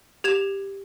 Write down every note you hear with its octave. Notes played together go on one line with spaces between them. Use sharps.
G4 G#6 E7 F7